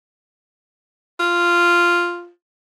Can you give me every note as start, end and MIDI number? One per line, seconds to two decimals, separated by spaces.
1.20 2.30 65